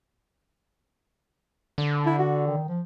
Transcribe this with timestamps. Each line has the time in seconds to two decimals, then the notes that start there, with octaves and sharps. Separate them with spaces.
1.78 D3
2.06 E4
2.19 F#4
2.48 D#3
2.68 F3